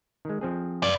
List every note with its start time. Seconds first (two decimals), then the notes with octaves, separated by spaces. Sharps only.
0.25 D#3 G#3
0.41 F3 C4 G#4
0.83 B4 D5